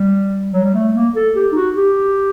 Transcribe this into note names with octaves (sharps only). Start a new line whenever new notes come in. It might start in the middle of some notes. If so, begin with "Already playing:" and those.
Already playing: G3
F#3
G3
A3
A#3
A4
G4
D#4
F#4
G4